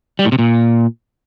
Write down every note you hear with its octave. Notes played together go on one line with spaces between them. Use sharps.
G3
A2
C3
A#2